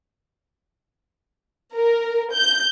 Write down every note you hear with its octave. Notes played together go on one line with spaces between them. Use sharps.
A#4
G6